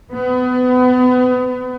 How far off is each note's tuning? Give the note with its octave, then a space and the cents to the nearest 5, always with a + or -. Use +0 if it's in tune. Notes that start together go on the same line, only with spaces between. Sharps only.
B3 +30